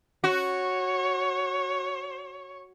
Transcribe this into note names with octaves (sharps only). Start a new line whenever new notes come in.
F#4 C#5